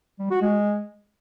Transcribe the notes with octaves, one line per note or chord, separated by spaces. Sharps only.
G3
F#4
G#3